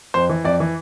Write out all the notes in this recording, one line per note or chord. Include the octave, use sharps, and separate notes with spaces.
F2 C5
E3
F2 D5
E3